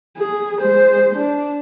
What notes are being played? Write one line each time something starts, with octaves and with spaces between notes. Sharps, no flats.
G#4
G#3 C5
D4